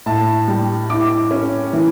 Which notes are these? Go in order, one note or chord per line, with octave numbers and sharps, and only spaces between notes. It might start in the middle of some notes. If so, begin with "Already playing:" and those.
A2 A5
G3
E4 D6
C#4
E3